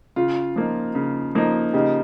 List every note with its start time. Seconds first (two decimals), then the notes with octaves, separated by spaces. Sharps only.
0.16 C#3 F4
0.56 F3 A#3 D#4
0.95 C#3
1.35 F3 A#3 D#4
1.73 C#3 D#4 G4